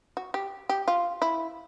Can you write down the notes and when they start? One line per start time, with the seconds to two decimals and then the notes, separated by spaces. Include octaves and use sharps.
0.17 F#4
0.34 G4
0.69 G4
0.88 F4
1.22 E4